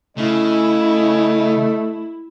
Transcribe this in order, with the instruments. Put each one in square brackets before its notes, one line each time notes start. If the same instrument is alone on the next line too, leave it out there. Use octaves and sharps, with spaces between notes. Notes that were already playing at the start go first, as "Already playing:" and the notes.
[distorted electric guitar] C#3 [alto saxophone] A3 [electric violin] E4 [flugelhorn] D#5